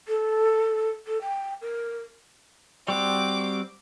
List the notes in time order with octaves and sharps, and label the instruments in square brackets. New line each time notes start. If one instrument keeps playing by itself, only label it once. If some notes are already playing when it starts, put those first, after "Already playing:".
[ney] A4
A4
G5
A#4
[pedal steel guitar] G3 C4 F#4 [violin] D6